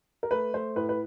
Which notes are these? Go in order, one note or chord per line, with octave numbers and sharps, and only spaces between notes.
A#4
A3 B4
A3 C5
A2 B4
B4